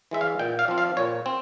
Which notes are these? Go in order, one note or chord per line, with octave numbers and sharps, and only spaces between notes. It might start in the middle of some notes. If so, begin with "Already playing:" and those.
E3 G#3 E5
F5
A#2 G5
F5
F3 C4
F5
A#2 C#5
C4